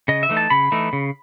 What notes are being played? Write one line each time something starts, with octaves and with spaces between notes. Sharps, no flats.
C#3 D#5
E5
E3 A3 D#4
A5
C#3 B5
E3 A3 D#4
C#3